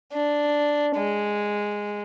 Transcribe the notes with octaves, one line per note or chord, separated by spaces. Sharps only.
D4
G#3